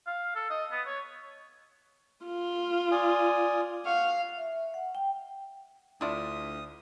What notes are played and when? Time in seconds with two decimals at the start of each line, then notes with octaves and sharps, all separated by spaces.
0.07 F5
0.35 A4
0.50 D#5
0.72 B3
0.87 C#5
2.25 F4
2.91 D5 G#5 D#6
3.85 F5 F#5 C#6
4.37 E5
4.74 F#5
4.95 G5
6.01 D2 D4 E4 F4 D5 E5 D#6